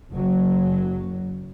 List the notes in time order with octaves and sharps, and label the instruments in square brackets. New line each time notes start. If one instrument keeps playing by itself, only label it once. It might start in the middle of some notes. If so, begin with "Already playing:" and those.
[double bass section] F#1 F#3